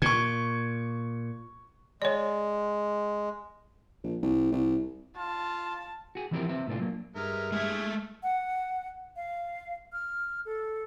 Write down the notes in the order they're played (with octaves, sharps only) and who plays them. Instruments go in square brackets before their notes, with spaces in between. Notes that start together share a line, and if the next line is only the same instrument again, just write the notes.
[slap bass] A#2 [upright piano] C#6 G#6
[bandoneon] G#3 [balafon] C#5 D5
[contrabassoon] A#1
C2
C2
[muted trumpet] F4 [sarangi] A5
[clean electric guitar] F#4 G#4
E3 F3 C4 E4 G4 A#4
C4 B4 E5
A2 C3 A3 D4 F4
F#3 A#3
[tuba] G2 [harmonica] G#3 A#4 E5 [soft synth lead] F6
[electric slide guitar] G#3 A3 E5 [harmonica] E4 G#4
[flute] F#5
F5
F6
A4